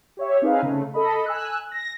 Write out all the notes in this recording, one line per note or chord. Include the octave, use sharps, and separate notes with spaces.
G4 C#5 E5
C4 D#4 G#4 B4 F5
C#3 A3
A4 D#5 B5
G#5 E6 F#6
A#6